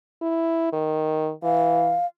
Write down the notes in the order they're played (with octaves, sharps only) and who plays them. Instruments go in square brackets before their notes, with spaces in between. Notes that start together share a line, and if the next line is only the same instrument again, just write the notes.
[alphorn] E4
D#3
[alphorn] E3 [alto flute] F5